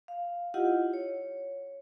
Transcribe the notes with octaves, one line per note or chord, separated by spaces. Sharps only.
F5
E4 F4 G4 D#5 F#5
C#5